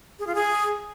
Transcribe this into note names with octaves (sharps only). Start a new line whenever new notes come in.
G#4
F4
G#4